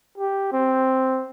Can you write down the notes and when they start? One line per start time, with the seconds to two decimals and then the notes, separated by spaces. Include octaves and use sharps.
0.18 G4
0.52 C4